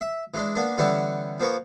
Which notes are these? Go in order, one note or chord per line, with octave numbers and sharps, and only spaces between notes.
E5
E3 G#3 D4
A#3 B3 D4
D3 E3 G3 B3 C#4 E4
F3 A#3 B3 C#5